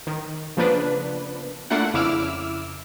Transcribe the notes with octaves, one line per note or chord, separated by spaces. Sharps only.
D#3
C#3 F3 A#3 B3 D4 B4
A3 A#3 D4 E4 F4 F#5
F2 C#3 E4 D6 E6 F6